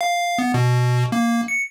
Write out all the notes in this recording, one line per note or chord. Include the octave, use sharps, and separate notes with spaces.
F5
B3
B2
A#3
C#7